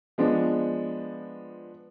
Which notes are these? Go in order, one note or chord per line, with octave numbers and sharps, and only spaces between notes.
F3 G#3 B3 D4